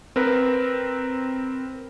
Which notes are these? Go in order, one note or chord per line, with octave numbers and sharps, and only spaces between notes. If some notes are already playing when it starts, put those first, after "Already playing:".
C4 A#4 B4